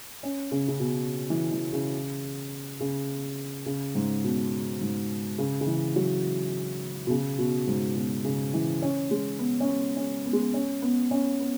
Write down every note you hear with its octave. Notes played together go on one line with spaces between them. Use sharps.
C#4
C#3
C#3
B2
E3
E3
C#3
C#3
C#3
G#2
B2
G#2
C#3
C#3
E3
F#3
B2
C#3
B2
G#2
B2
C#3
E3
C#4
G#3
B3
C#4
B3
C#4
B3
G#3
B3
C#4
B3
C#4
B3